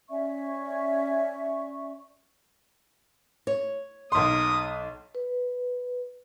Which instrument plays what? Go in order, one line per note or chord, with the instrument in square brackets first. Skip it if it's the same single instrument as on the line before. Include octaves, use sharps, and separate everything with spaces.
[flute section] C#4 D5 E5 C#6
[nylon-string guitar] C#5
[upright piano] B1 C6 [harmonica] A#3 D#6
[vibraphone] B4